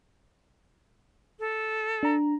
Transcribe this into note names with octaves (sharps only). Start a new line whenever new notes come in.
A4
D4 A#5